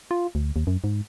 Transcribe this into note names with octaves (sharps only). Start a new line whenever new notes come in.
F4
D2
D#2
F#2
G#2